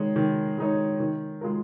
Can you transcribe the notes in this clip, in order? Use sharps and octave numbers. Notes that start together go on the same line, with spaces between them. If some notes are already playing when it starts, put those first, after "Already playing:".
Already playing: D#3 G#3 D#4 C#5
D#3
G#3 D#4 C#5
D#3
G#3 F4 A#4